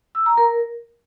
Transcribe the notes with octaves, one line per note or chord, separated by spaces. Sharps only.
E6
A#5
A#4